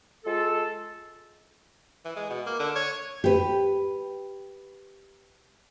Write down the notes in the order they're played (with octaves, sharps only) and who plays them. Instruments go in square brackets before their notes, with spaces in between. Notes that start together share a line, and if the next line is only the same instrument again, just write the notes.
[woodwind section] G#3 F4 A4
[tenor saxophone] E3
G#3
B2
A#3
D3
C#5
[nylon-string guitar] G4 B4